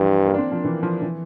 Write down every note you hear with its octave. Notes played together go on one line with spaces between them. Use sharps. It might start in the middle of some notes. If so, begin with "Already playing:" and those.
Already playing: G2 E3 F3
A#3
D4
C4
F3
E3
F3
E3